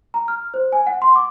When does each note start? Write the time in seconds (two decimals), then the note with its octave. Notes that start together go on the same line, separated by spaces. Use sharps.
0.14 A#5
0.28 F6
0.54 C5
0.72 G#5
0.87 F#5
1.02 C6
1.16 D6